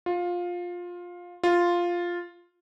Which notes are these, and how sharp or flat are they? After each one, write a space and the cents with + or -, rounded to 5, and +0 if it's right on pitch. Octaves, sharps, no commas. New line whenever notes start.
F4 +15
F4 +0